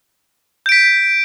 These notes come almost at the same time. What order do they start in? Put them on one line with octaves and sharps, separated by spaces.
G6 D7 B6